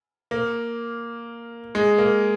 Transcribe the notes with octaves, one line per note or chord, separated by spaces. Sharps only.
A#3
G#3
A#3